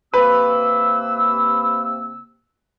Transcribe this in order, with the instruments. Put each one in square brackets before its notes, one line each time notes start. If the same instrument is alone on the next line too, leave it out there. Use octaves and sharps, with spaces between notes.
[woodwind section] C3 A#3 E6 [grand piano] B4